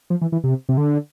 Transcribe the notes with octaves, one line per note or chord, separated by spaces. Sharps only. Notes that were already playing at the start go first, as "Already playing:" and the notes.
F3
E3
E3
C3
C3
D3